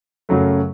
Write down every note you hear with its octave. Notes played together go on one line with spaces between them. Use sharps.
F#2 C#3 F#3 A3